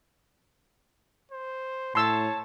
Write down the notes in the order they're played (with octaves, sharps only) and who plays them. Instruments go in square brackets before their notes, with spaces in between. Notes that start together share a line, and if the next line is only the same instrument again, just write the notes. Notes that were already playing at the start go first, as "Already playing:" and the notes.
[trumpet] C5
[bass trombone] A2 [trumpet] C#5 [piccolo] A5 [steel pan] C6 E6